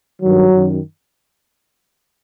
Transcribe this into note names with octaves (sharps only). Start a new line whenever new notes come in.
G2 D#3 F#3
F#2 D#3